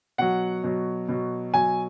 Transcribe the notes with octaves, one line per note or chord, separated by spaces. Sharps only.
B2 F#3 F#5
B2 F#3
B2 F#3
B2 F#3 G#5